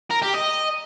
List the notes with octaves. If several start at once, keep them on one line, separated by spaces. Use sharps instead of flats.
A#4
G4
D#5